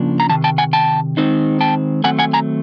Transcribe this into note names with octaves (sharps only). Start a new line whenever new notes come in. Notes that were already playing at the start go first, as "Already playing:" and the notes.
Already playing: C#3 F3 A#3 D4
A#5
C3 D#3 A5
G5 A5
F#5 G#5
G5 A5
D#3 G#3 C4 D#4
G5 A5
D#3 F#3 A3 C4 F#5 G#5
F#5 G#5
G#5 A#5